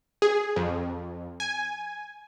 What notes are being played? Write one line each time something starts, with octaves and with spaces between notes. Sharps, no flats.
G#4
F2
G#5